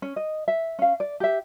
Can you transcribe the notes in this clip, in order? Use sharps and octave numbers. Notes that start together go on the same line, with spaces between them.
C#4
D#5
E5
C#4 F5
D5
G4 E5